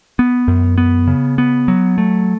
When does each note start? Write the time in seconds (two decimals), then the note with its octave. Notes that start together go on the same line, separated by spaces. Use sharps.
0.19 B3
0.48 F#2
0.78 B3
1.07 C#3
1.38 B3
1.68 F#3
1.98 A3